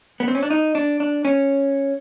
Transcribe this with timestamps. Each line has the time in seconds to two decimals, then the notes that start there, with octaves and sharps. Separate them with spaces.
0.20 B3
0.28 C4
0.35 C#4
0.43 D4
0.50 D#4
0.75 D4
1.00 D4
1.25 C#4